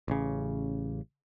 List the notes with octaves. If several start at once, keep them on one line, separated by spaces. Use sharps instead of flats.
A1 C#3